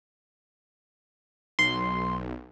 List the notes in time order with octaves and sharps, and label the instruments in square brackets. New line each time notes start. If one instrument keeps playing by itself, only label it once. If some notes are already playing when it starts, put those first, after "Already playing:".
[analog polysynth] B1 [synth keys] C6